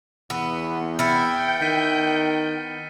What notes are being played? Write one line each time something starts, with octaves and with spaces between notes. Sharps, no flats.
E2 B3 E6
B3 E4 G5 F6 G6 A6 C#7
D#3 A6 B6 D#7